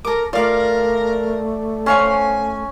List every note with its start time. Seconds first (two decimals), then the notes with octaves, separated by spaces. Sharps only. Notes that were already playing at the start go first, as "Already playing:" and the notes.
0.05 A4 A#4 D6
0.33 A3 F4 A#4 D5 F5 D6
1.86 C#4 C5 F5 G#5 C#6